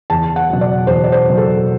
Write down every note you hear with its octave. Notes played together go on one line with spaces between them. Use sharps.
E2 A5
F#5
B2 F#3
D5
E2 C5
D5
C5
B2 F#3
A4